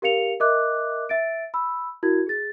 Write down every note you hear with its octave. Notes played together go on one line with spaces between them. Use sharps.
G4 A#4 F5 C#7 F7
A#4 D#5 E5 D6 F#6
E5 A6 D7
B5 E6
E4 F#4 A#4 G#6
G#4 A6